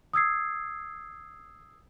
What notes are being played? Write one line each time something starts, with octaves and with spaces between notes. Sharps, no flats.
D#6 E6 G#6 C7